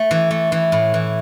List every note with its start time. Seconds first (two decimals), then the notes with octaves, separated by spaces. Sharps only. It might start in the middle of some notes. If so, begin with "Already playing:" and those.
Already playing: A3
0.11 E3
0.31 A3
0.52 E3
0.72 A2
0.94 E3